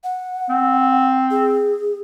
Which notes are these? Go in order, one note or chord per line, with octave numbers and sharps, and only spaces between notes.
F#5
C4
G#4